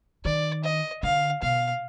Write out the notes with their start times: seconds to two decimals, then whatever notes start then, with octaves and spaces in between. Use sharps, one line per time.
0.25 D#3 D5
0.64 D#5
1.03 D3 F5
1.42 B2 F5